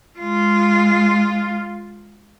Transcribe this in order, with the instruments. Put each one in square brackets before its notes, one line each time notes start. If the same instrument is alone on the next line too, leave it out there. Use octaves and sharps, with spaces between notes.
[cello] G#3 F4